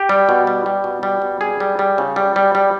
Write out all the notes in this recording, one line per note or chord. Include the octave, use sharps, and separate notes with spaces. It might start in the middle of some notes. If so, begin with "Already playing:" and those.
Already playing: G4
G3
B2
G3
G3
B2
G3
B2
G3 G#4
G3
G3
C#3
G3
G3
G3